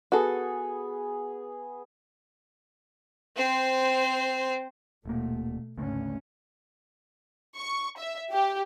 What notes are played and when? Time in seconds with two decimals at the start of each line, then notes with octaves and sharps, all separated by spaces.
0.12 B3 F#4 G#4 A4
3.36 C4 C5
5.05 D#1 B2 A3 A#3
5.78 G#1 D2 C#3 A3 C#4
7.56 C#6
7.98 E5
8.31 G4